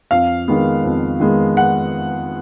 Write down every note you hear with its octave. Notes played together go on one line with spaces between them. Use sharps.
F2 F5
D#3 G#3 B3
F2
D#3 G#3 B3
F#5